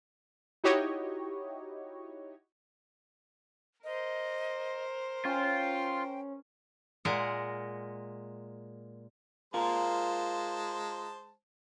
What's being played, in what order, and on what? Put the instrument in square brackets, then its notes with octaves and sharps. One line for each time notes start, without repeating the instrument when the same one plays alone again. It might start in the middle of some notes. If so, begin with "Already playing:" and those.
[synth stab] D#4 E4 F#4 G4 C#5 D#5
[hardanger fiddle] A#4 C5 [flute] D#5
[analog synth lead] C#4 [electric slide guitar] F4 [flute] G5
[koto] A#2 G#3 A#4 F#5
[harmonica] G#3 C5 A5 [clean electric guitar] F4 A#4